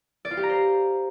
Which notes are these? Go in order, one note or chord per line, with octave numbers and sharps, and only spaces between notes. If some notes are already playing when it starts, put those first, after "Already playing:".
D5
F4
G4
A#5
C5